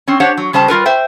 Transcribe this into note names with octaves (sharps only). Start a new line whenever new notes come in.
C4 C#4
D4 G4 C5 C#5 F#5
F#3
C#3 G3 C5 A5
G3 F4 A#4 B4
C5 E5 G5